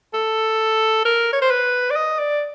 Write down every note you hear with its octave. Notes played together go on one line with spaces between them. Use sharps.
A4
A#4
C#5
C5
B4
D5
D#5
D5